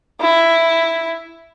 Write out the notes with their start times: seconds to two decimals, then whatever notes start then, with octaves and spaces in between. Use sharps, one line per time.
0.21 E4